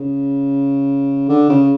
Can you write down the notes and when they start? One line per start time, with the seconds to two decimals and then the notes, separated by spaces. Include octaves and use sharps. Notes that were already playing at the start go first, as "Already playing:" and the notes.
Already playing: C#3
1.29 D3
1.49 C#3